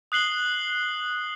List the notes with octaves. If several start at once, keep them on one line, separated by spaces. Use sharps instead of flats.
D#6 F#6 C7 F#7 G7